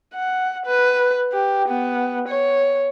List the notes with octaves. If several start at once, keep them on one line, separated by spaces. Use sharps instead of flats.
F#5
B4
G4
B3
C#5